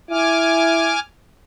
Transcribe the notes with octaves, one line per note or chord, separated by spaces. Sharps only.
E4 G#5 D6 F6